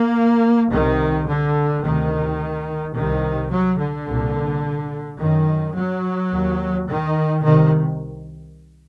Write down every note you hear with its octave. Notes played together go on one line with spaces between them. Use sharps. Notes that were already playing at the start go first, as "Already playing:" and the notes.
Already playing: A#3
C2 C3 D#3
D3
D2 C3 D#3
C2 C3 D#3
F#3
D3
C2 A#2
F#2 D#3
F#3
D#2
D#3
C2 C3 D#3